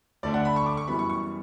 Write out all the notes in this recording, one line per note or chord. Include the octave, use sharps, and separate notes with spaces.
D2 D3 A3 D4 D5
F#5
B5
C#6
D6
C#6
F#2 E3 G3 B3 B5
C#6
C#6